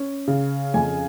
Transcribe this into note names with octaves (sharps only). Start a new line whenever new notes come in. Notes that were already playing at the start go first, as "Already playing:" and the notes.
Already playing: C#4
C#3
F2 G#5